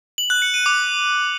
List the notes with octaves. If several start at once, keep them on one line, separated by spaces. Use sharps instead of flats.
F#7
F#6
C#7
D#7
D6